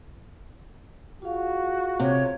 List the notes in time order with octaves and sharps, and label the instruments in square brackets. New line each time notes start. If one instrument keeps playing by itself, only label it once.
[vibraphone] F4 G#4 F5 [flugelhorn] F#4
[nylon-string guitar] C3 [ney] C#5